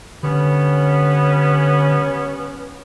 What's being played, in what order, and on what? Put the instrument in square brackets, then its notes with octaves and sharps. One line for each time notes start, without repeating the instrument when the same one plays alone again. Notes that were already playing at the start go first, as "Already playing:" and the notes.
[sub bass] D3 [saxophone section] G3 B3 C#4